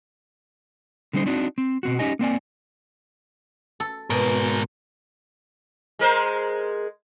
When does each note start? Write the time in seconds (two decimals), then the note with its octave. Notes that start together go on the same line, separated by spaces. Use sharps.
1.13 D3 G3 C#4 D#4 C5
1.26 C4 D4 D#4 F#4
1.58 C4
1.83 B2 C4 F#4
1.99 C#4 D#4 G4 D#5 G#5
2.19 A#3 C4 D5 G#5
3.80 A4
4.10 G#2 B2 A#4
5.99 G#3 A#4 C5